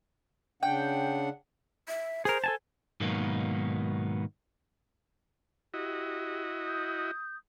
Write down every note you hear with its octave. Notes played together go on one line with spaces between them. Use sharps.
C#3 D4 F#5 G5
E5
G#4 A#4 C5
A4 G#5 A5
G#2 B2 D#3 F#3 A#3 B3
E4 F#4 G4 D#5
D#6 G6